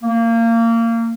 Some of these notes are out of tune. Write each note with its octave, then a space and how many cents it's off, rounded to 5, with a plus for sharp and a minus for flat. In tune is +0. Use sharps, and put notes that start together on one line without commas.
A#3 -25